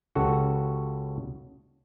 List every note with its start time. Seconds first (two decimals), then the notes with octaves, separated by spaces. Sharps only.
0.15 C#2 C#3 F#4 G4 A4 F#5